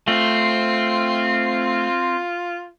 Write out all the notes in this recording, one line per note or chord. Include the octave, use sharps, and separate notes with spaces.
A3 C4 F4